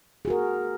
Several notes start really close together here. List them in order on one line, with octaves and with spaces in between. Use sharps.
G#4 F#4 A#4